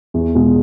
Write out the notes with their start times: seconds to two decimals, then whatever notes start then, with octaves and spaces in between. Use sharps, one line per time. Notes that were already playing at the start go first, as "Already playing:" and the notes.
0.14 E2
0.35 B2 G#3